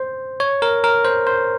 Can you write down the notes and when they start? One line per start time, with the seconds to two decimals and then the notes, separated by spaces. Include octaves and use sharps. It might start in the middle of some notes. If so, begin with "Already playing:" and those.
Already playing: C5
0.40 C#5
0.62 A#4
0.84 A#4
1.05 C5
1.27 C5